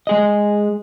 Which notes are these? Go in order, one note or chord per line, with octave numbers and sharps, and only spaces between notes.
G#3 G#4 D#5